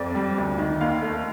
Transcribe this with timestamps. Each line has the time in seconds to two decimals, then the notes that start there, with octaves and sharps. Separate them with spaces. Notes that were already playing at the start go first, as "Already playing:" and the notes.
Already playing: F2 C4 D5
0.15 G3
0.38 D2
0.58 D#3
0.81 D#2 F5
1.02 A3